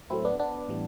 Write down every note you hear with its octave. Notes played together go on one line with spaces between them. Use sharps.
A2 F#3 A3 C4 E4
B3 D4
B3 D4
A2 E3 G3